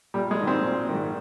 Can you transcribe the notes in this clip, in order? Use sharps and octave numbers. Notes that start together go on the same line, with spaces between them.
A#1 G3
G#3
G#2 D#3
C4
A#1
G#2 D#3